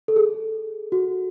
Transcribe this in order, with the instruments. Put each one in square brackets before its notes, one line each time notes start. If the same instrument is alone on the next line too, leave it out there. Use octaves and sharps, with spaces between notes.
[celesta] A4
G#4
F#4